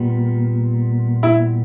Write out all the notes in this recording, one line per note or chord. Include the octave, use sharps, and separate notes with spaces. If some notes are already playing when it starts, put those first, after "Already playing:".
Already playing: A#2 G3 B3
E4